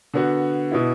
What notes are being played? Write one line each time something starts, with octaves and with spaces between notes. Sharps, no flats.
D3 B3 F#4
B2 B3 E4